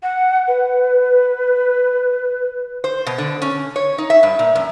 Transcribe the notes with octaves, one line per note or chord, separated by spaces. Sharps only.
F#5
B4
C5
B2
D3
C#4
C#5
D#4
E5
G2
A#2
F#2